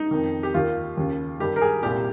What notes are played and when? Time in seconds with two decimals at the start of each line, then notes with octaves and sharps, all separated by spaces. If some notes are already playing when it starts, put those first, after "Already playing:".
Already playing: D#4
0.11 F2 D#3
0.43 G4
0.54 D#2 D#3 F4
0.97 D#2 C#3
1.40 G2 D#3 G4
1.56 A#4
1.62 G#4
1.83 C2 A#2 G4